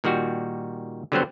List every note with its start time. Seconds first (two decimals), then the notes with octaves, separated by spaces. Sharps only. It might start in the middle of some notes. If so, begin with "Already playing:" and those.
0.04 A#2 D#3 G3 F#4
1.12 D3 F#3 G3 B3 C4 C5